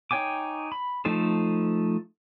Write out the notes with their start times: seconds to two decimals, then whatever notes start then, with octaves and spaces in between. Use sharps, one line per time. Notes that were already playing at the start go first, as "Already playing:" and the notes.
0.11 D#4 C#5 G5 G#5 D6
0.72 B5
1.05 F3 A3 D#4 A4 C5